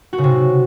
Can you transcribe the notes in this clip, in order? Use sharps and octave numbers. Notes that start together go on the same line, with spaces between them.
F#4
C#3
C3